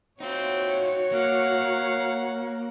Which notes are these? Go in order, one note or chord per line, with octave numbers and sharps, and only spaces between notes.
C4 D#4 F4 F#4 C#5
A#3 F5 F#5